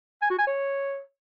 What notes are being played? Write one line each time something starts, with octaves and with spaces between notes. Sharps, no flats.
G#5
F#4
G#5
C#5